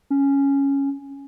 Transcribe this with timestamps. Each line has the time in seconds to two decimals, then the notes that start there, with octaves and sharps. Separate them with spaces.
0.10 C#4